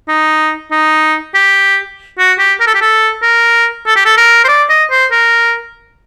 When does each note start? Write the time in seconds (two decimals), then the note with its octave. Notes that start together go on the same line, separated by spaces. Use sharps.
0.08 D#4
0.71 D#4
1.34 G4
2.18 F#4
2.39 G4
2.60 A#4
2.67 A4
2.75 G4
2.82 A4
3.23 A#4
3.86 A4
3.96 G4
4.05 A4
4.17 A#4
4.44 C5
4.48 D5
4.69 D#5
4.91 C5
5.11 A#4